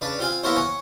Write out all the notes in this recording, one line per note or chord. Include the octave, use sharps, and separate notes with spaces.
C#3 D4 B4
C4 F4 F5 G#5
A#3 B3 E4 A#4 C5 C#5
C#5 F#5 G#5